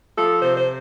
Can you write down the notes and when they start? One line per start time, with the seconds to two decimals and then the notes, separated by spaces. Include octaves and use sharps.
0.16 F3 A4
0.41 C3 C5
0.56 C5